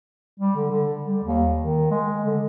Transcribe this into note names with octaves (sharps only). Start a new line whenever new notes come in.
G3
D3
D3
G3
D#2
D#3
G#3
D3